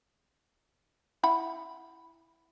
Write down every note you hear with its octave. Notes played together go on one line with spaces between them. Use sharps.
E4 F#5 B5